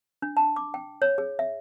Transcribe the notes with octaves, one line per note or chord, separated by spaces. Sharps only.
D4
A5
D6
G5
C#5
G#4
E5